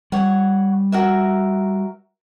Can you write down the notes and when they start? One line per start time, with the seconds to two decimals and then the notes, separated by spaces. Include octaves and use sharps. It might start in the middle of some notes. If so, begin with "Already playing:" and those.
0.12 G3 C#5 F#5
0.92 F#4 A#4 E5